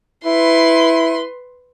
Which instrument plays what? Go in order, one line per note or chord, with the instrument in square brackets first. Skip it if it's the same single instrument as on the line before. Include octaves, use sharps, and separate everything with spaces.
[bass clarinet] E4 [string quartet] B4 C6